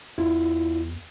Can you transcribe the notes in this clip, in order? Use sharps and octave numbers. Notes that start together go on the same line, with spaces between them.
E2 E4 F4